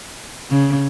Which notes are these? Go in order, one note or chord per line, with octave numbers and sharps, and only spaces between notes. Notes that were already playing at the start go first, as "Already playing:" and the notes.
C#3